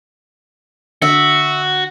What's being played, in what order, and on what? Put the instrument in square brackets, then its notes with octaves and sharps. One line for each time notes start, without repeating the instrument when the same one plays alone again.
[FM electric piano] D3 [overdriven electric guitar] F#4 [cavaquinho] E5